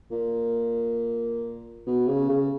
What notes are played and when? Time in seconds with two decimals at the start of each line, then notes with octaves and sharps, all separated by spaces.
0.11 A#2
1.86 B2
2.08 C#3
2.29 C#3